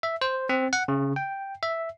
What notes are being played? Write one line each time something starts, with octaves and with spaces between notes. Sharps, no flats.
E5
C5
C4
F#5
C#3
G5
E5